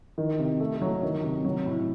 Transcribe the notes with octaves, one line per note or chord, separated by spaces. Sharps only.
D#3
C3
A3
F#3
D#3
C3
F#3
A2